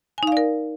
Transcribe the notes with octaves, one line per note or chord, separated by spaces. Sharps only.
D#4 A#4 D5 F5 G#5